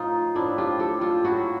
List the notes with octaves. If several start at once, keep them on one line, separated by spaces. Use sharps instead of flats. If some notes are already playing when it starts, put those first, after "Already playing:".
Already playing: A2 F3 D#4 F4
A2 F3 D4 E4
F4 G4
G4 A4
F4 G4
A2 F#3 E4 F#4